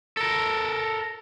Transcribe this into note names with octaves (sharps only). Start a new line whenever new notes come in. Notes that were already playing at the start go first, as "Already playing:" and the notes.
A4 A#4